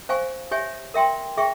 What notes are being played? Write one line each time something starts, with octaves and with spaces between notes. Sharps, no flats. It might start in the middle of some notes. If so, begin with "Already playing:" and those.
C5 F5 G#5 C#6
G4 C#5 E5 G#5
A#4 E5 G5 C6
G#4 E5 G5 C#6